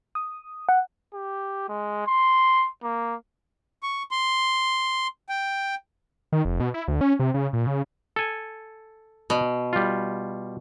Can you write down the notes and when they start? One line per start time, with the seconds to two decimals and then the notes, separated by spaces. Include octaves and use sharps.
0.15 D#6
0.69 F#5
1.13 G4
1.68 G#3
2.07 C6
2.83 A#3
3.83 C#6
4.11 C6
5.29 G5
6.32 D#3
6.45 F1
6.60 B2
6.74 E4
6.88 D2
7.01 C#4
7.19 C3
7.34 C#3
7.53 A#2
7.67 C#3
8.16 A4 G#5
9.30 B2
9.73 G3 F4